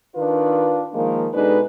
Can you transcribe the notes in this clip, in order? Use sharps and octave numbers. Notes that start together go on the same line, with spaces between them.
D#3 D4 F4 B4
D#3 F3 G#3 A#3
B2 G#3 D4 D#4 A4 B4